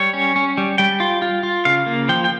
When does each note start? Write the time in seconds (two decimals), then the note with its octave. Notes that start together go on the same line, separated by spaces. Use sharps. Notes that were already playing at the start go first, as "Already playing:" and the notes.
Already playing: G3 C#5
0.13 C#4
0.36 C#4
0.58 G3
0.78 G3 G5
1.00 F4
1.22 F4
1.43 F4
1.65 C#3 F5
1.86 A#3
2.09 F3 G5
2.24 G5